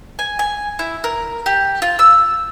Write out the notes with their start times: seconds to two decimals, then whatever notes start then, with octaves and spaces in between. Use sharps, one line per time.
0.19 G#5
0.39 G#5
0.79 E4
1.04 A#4
1.46 G4
1.82 F4
1.99 E6